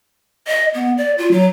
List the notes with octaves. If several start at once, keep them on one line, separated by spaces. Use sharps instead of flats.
D#5
B3
D5
F4
F#3